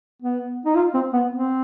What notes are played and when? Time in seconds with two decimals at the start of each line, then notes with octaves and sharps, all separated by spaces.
0.22 B3
0.66 D#4
0.76 F4
0.94 C4
1.13 B3
1.31 C4